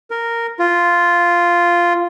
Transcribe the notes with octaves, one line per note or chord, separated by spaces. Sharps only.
A#4
F4